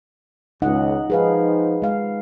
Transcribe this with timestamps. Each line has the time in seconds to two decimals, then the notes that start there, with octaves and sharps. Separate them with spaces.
0.62 C#2 D#4 D#5 F#5
1.10 F3 D#4 G#4 B4 F5
1.82 G#3 F5